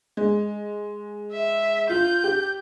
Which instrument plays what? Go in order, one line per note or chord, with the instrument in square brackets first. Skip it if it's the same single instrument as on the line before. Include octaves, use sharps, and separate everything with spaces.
[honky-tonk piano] G#3
[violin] E5
[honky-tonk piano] F4 [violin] G6
[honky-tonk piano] G4